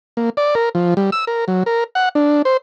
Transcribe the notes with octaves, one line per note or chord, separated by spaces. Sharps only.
A#3
D5
A#4
F3
G3
E6
A#4
F#3
A#4
F#5
D4
C5